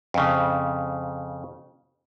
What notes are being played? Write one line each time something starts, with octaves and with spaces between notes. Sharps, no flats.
F2 C#3